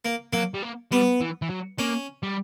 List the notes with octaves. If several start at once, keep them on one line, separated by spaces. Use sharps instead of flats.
A#3
F#3 A#3
G3
A#3
G3 B3
E3
E3
F#3
A#3 C#4
G3